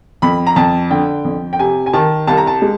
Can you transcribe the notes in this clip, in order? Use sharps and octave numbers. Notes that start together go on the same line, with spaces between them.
F2 B5
A#5
F2 A5
D3 G5
F2
G5
C3 G#5
G#5
D#3 A5
C2 A5
A#5
A5
G#3